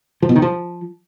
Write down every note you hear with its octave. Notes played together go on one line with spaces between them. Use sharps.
F3
B2
D#3
F3